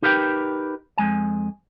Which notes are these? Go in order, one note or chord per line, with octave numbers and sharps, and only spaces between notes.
D#4 G4 A#4 B4 F5 G5
F2 G#3 G#5